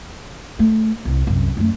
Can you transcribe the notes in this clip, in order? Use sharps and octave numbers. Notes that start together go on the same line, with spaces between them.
A3
C2
C2 F#2
F#2 A3